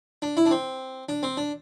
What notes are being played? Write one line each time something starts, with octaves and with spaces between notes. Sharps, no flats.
D4
E4
D4
C4
D4
C4
D4